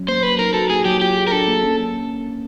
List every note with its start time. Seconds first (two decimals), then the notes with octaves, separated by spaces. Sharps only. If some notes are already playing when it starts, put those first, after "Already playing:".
Already playing: F#3 C#4
0.08 A#3 C5
0.23 F#3 B4
0.39 D#4 A#4
0.54 F#4 A4
0.70 A#3 G#4
0.85 F#3 G4
1.01 F4 G4
1.16 G#4
1.27 A#4
1.32 D4 A4
1.47 A#3
1.63 C#4